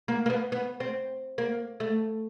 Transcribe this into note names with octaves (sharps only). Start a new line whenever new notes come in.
A#3
A#3
B3
B3
C4
A#3
A3